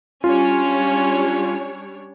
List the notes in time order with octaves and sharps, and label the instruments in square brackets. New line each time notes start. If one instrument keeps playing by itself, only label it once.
[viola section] G3 D4 C#5 [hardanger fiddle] C#4 [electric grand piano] F4